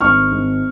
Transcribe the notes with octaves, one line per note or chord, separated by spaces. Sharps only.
G#1 C#6 F6
G#1